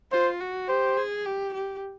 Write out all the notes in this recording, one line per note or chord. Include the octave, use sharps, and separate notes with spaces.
F4 C5
F#4
G4 C5
G#4
G4
G4